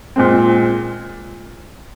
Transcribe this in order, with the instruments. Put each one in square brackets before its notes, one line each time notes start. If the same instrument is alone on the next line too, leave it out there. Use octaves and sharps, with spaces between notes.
[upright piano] A#2 G#3 C4